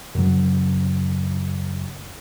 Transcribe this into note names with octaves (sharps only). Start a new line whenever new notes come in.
F#2 C#3 F#3